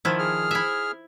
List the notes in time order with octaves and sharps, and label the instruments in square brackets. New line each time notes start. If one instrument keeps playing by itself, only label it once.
[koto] D#3 F3 E4
[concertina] G#4 F6
[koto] E4 E5